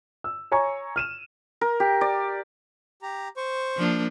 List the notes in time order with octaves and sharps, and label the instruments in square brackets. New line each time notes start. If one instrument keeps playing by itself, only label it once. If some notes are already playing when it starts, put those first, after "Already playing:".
[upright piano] E6
C#5 G#5 A#5 C#6
F6 D#7 E7
[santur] A#4
G4
D5
[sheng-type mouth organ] G4 A#5
C5 C#6
[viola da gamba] F3 A#3 D4